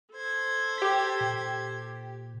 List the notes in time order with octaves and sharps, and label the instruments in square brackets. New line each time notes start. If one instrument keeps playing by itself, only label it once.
[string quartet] A4 C5 G#6
[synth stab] G4 B6
[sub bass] A#2